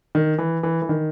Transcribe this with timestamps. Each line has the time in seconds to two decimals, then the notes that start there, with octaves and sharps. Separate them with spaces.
0.15 D#3
0.38 E3
0.63 E3
0.82 E3
0.89 D#3